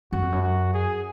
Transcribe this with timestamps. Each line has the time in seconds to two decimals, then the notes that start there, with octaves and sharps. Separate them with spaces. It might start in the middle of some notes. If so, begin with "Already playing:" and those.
0.12 F#2 F#4
0.22 F2
0.32 F#2
0.43 F#4
0.74 G#4